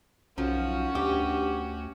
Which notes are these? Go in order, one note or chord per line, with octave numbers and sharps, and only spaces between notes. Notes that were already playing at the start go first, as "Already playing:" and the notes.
B1 F#2 F3 C#4 F#4
D2 G2 G4